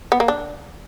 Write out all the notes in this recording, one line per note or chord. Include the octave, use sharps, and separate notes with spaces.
B3
A#3
D4